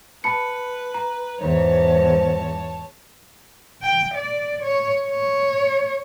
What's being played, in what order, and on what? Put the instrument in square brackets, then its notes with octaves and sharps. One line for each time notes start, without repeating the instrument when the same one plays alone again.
[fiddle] B4 [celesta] A5 B5 C#7
[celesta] A#5
[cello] E2 G#2 [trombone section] C5 [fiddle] C#5 A5
[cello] G5
D5
C#5
C#5